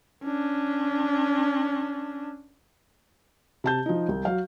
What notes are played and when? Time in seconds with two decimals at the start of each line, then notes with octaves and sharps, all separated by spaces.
0.23 C#4 D4
3.64 C3 A5 G6
3.86 F3 D#4
4.09 C2
4.25 F#3 F5